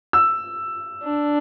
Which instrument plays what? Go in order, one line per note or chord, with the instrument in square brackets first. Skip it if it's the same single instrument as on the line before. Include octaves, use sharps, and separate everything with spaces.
[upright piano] E6
[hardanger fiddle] D4